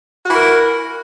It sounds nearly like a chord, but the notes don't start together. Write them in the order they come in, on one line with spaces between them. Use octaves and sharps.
F#4 E4 A#4